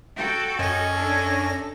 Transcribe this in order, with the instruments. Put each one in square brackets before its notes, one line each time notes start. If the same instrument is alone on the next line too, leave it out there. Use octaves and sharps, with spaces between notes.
[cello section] F#4 A4 [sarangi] G5
[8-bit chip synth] F#2 A#6 [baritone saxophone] C#4 [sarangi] D#5
[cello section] D4 [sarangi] A4
[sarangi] A4